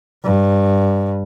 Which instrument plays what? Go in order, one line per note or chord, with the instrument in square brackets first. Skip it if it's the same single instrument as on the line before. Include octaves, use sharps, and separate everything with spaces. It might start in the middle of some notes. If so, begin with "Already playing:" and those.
[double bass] G2